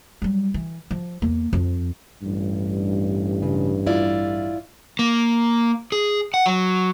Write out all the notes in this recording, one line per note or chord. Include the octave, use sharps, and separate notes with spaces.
F#3 G3
E3
F3
E2 A#3
F2 F3
A1 G2
C#3
E4 F4 D5
A#3
G#4
F#5
F#3